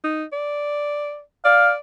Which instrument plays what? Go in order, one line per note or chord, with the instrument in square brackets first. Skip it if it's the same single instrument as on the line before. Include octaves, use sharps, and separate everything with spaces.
[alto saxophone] D#4
D5
[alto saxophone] D5 [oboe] F5